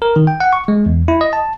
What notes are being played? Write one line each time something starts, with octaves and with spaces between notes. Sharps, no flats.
A#4
D#3
G5
F#5
C#6
G#3
E2
E4
D#5
A5